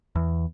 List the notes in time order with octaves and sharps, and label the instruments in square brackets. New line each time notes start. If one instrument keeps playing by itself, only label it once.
[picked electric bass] E2